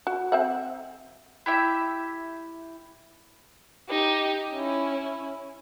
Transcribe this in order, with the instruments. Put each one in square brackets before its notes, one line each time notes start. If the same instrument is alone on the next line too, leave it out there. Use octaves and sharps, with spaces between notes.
[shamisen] F#4
C4 E5 F#5
[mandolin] E4 G4 E5
[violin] D#4 G4
C#4 E4